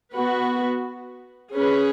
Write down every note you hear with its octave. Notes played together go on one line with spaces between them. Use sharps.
B3 F#4 B4
C#4 G#4 B4